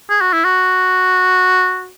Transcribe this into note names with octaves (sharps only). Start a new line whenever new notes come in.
G#4
F#4
E4
F#4